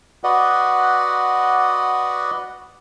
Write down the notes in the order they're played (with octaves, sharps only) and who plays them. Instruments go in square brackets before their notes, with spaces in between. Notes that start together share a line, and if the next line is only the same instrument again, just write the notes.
[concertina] F#4 B4 D5 D#5 F#5